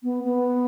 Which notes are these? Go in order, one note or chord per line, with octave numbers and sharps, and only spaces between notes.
B3
B3